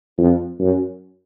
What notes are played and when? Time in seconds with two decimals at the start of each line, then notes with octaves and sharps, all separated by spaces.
0.18 F2
0.59 F#2